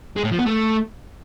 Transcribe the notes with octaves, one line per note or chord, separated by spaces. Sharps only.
G#3
A2
F3
B3
A3